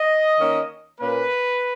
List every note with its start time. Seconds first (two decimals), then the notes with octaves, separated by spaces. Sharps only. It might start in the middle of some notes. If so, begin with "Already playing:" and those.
Already playing: D#5
0.38 D#3 A#3 C#4
0.99 A#2 A#3 C#4 B4